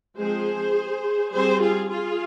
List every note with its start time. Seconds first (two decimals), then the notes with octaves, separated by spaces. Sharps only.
0.18 F3 G#3 C4 G#4 C5
1.33 G3 C4 G#4 C5
1.61 F4 G#4
1.90 F4 G#4